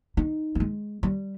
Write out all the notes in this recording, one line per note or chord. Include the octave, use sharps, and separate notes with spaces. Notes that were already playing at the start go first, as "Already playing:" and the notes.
D#4
A#3
G#3
G3